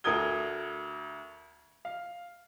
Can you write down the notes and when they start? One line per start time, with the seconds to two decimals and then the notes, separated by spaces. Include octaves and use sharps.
0.04 D2 A4 A#4 D#6 G#6 G7
1.85 F5